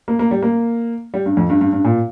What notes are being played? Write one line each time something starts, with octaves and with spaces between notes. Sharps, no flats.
A#3
A#3
G3
A#3
G3
G2
F2
G2
G2
G2
A#2